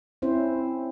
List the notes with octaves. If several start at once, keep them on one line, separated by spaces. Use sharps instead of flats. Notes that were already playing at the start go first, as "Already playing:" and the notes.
C4 C#4 E4 C5